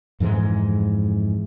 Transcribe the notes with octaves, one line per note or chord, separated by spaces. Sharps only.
F2 G#2 E3 G#3